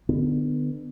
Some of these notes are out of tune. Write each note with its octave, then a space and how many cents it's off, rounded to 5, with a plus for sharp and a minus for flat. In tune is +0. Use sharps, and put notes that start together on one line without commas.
D3 +35 B3 +15